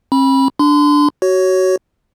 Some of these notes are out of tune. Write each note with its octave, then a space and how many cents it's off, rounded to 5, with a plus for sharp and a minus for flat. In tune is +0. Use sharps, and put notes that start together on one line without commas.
C4 +45 B5 -20
D4 +0 C6 -35
F#4 +20 C#5 +0